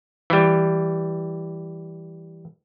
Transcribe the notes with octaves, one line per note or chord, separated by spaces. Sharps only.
E3 G3